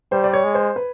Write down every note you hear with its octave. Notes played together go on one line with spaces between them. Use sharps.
G3 C5
D5
C#5
G#3
C5
B4